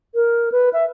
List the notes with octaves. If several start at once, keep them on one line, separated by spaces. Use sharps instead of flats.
A#4
B4
E5